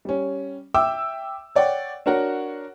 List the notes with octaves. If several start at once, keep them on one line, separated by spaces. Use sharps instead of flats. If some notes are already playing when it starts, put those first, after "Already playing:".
G3 C#4
E5 G5 D6 E6
C#5 D5 F#5 G5
D4 F#4 A#4 C#5 F#5